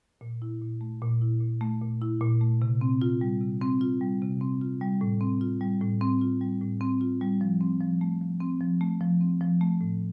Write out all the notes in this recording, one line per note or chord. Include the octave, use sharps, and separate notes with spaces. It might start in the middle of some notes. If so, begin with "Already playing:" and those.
A#2
E4
A#2
A3
A#2
E4
A#2
A3
A#2
E4
A#2
A3
C3
C4
F4
G3
C3
C4
F4
G3
C3
C4
F4
G3
A2
C4
F4
G3
A2
C4
F4
G3
A2
C4
F4
G3
F3
C4
F3
A3
F3
C4
F3
A3
F3
C4
F3
A3
A2